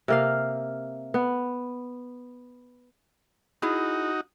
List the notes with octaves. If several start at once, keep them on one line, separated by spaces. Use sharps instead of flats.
C3 A#3 F5
B3
D#4 E4 F#4 G#4